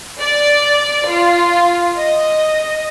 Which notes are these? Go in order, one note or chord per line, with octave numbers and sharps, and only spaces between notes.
D5
F4
D#5